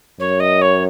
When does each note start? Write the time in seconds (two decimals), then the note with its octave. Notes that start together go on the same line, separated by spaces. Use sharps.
0.20 F#2 C#5
0.40 D#5
0.62 C#5